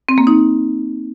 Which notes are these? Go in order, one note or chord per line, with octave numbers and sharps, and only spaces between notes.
C4
A#3
D#4